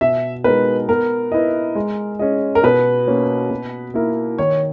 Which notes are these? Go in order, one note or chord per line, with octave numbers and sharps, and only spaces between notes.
B2 E5
G#3 B3 D#4 A#4 B4
B3 A#4
E4 B4 D#5
G#3
C#4 G#4 D#5
A#4
B2 B4
A#3 C#4 F#4 C#5
B2
A#3 E4 A#4 E5
D#3 C#5